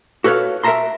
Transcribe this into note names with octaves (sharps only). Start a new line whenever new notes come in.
F#4 A4 B4 C#5 F5
A#4 E5 F5 A5 A#5 C6